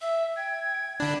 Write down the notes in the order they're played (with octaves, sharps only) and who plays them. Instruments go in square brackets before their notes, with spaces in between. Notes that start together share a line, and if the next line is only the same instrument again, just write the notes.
[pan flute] E5 [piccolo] E6
[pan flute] G5 [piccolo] G#6
[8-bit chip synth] D3 D4 [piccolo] B5